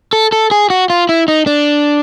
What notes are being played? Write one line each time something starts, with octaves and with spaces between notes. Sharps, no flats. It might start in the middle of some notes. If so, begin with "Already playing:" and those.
A4
A4
G#4
F#4
F4
E4
D#4
D4